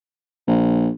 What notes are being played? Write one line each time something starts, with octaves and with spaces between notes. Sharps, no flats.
A#1